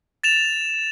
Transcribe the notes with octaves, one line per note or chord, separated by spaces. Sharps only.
A6 E7 F7